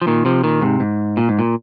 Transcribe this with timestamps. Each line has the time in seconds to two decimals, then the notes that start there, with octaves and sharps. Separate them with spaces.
0.02 F3
0.07 A#2 D#3
0.25 C3 F3
0.44 A#2 D#3
0.61 G#2 C3
0.80 G#2
1.17 A#2
1.29 G#2
1.39 A#2